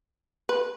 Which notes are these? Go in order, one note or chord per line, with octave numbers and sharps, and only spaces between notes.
B4